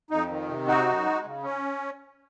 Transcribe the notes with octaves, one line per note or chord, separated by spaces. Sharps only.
F2 D#4
D#3
C3
C4 D#4 F#4
F#2
G#3
C#3
C#4